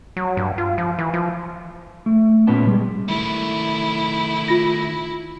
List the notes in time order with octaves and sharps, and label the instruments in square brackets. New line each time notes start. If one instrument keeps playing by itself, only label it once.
[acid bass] F#3
G2
F4
F3
E3
F3
[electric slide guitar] A3
A#2 B3 C#4 B4 G5 A5
G3 G#3
[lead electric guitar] D#3 A3 [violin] E4
[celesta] F4 A#6